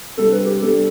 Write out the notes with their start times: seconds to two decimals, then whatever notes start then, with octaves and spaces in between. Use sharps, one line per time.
0.17 C3 G3 D4 A4
0.32 B4
0.46 G4
0.62 C3 G3 D4 A4